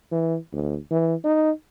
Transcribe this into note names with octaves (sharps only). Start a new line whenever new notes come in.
E3
D2
E3
D#4